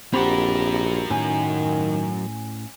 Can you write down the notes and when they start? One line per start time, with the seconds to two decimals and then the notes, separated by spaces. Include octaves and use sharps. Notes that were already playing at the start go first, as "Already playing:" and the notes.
0.14 A#1 F#3 C4 G4 A#4 F#5 B5
1.10 A2 D#3 C#4 G#5